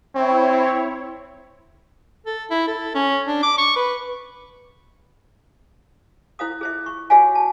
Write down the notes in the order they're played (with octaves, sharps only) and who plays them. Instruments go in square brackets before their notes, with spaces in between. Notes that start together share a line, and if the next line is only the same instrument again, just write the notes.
[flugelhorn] C4 [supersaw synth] E4 C#5
[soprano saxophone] A4
E4
A4
C#4
D4
D6
C#6
B4
[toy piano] E4 C5 F5 D#6
G#4 C5 E5
C#6
F#4 G#4 C#5 E5 F5 G#5
A5